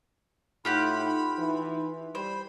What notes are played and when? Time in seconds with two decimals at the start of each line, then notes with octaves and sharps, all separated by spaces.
0.65 A2 D#4 F4 G4 F#5 B5
1.38 E3
2.15 G3 C5 B5